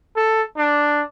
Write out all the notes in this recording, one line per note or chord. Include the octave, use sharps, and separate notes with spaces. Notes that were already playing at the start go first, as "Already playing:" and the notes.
A4
D4